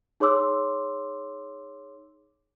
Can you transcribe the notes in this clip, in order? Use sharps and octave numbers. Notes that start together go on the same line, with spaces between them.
D#4 G#4 C#5 C6 D6 E6